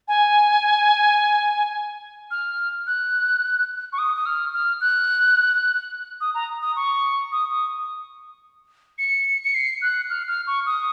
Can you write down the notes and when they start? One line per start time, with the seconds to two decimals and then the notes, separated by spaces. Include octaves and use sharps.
0.08 G#5
2.31 F6
2.87 F#6
3.93 C#6
3.98 D#6
4.17 D#6
4.26 F6
4.54 F6
4.81 F#6
6.21 D#6
6.35 A#5
6.62 D#6
6.76 C#6
7.32 D#6
7.51 D#6
8.98 C#7
9.44 C#7
9.55 C7
9.82 F#6
10.10 F6
10.28 F6
10.47 C#6
10.66 D#6